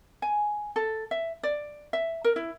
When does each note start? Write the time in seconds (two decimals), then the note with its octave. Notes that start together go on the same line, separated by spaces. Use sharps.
0.22 G#5
0.76 A4
1.11 E5
1.43 D5
1.93 E5
2.24 A#4
2.36 E4